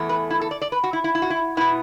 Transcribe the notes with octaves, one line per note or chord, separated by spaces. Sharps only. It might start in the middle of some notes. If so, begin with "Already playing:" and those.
Already playing: E2 E3 A3
B4
E4
A4
D5
D5
B4
F#4
E4
E4
E4
F#4
E4
B2 B3 E4